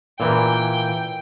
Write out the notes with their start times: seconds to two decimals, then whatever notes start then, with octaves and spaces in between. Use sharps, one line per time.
0.20 A#2 E3 G5